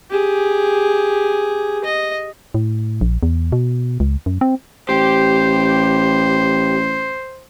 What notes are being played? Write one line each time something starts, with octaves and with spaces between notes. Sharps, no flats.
G4 G#4
D#5
A2
A#1
E2
B2
C#2
F#2
C4
A1 G4 C5